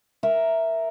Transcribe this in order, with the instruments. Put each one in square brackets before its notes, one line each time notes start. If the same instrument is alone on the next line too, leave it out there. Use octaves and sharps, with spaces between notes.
[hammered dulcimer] A#4 E5 A#5